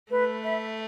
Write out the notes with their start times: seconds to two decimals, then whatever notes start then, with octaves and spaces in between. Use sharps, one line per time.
0.11 A3 B4
0.43 E5 B5